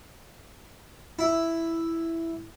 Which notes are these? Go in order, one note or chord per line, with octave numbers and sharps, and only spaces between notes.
E4